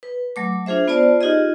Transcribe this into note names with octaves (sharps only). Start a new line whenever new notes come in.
B4
F#3 A3 D6
D4 F4 G#4 C5 E5
B3 F4 C5 D5 A5
D#4 F4 G4 G#4 D#5